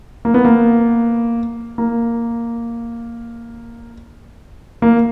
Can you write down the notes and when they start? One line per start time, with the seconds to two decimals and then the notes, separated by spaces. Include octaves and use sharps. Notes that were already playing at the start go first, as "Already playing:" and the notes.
0.25 A#3
0.34 B3
0.45 A#3
1.78 A#3
4.82 A#3